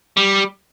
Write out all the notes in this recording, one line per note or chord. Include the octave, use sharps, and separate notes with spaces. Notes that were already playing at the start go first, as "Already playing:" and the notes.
G3